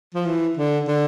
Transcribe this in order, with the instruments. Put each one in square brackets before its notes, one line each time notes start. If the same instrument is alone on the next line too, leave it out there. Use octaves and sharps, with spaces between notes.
[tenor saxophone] F3
E3
D3
D3